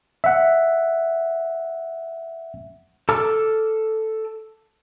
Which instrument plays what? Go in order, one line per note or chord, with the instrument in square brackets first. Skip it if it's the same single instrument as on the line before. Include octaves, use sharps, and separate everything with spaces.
[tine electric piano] E5 F#5
[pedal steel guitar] A4 A5 D6 E6 F6